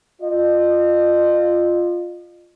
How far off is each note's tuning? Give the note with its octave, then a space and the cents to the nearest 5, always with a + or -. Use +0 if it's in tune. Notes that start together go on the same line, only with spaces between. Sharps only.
F4 +0 D#5 -40